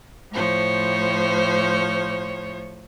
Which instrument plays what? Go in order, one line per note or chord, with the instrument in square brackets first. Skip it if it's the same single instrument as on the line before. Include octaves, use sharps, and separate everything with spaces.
[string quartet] A2 F3 C5 C#5